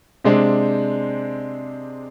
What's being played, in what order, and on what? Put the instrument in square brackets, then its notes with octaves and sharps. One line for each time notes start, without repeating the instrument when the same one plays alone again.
[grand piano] C3 G#3 C4 D4